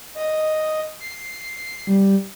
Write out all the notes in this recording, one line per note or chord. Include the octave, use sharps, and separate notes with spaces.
D#5
C7
G3